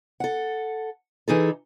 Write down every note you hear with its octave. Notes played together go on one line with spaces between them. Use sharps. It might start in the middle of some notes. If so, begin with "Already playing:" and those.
A4 F#5
E3 D#4 G#4 A4